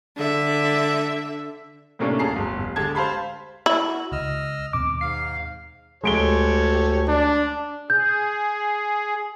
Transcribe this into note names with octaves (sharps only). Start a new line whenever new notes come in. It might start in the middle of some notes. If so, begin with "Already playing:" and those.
D3 E5
A2 C3 A3 A#3 C#4 D4
D1 G#4 A5 A#5 C7
G1
F1
D3 G#3 G4 A5 G#6
C5 F5 A5 B5 C6
E4
F#4
C#2 D#5 E6 F6
D#2 B2 C4 D6
G#2 F5 C7
D2 G#3 G4 A4 C#5 D7 G7
D4
G#4 G6